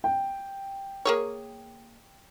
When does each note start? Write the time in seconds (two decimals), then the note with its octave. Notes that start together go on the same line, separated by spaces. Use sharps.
0.04 G5
1.05 A#3 G#4 C#5